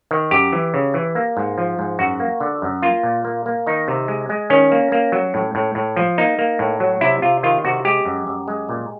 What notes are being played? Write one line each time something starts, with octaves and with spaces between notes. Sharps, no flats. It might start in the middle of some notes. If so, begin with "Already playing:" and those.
D#3
F#2 G4
E3
C#3
E3
A#3
G#2
F3
G#2
F#2 F#4
A#3
D3
F#2
A#3 F4
A#2
A#3
A#3
D#3 D#4
C3
G#3
G#3
D#3 C#4
A#3
A#3
F#3
A2
A2
A2
F3
A#3 D#4
A#3
A2
F#3
C3 E4
C3 F4
D#3 F4
C3 F#4
G#3 G4
F#2
F#2
G#3
A#2